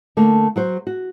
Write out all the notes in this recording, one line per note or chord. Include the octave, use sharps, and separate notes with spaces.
D3 A3 A#3
F#3 F#4 C5
F#4